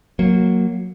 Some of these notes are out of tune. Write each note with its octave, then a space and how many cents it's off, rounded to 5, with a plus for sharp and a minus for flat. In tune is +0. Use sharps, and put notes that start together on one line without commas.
F#3 -5 A#3 -5